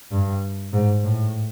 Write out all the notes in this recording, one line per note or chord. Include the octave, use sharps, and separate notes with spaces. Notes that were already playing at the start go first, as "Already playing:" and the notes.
G2
G#2
A2